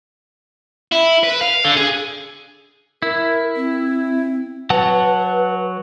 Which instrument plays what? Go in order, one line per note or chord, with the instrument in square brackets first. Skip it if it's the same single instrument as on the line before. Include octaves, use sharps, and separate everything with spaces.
[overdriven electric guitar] E4
B4
F5
D3
G#4
[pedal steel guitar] E4 [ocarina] A#4
[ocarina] C4
[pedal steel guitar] F#3 F#5 A5 [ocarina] B4